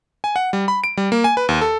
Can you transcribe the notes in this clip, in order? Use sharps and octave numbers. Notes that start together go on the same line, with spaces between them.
G#5
F#5
G3
B5
D7
G3
A#3
G#5
B4
D#2
A4